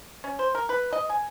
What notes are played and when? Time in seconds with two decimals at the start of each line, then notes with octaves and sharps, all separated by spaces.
0.24 C#4
0.39 C5
0.55 A#4
0.69 B4
0.93 D#5
1.10 G#5